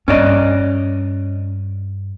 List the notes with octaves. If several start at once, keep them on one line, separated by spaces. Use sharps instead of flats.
G2 C#4 D5 D#5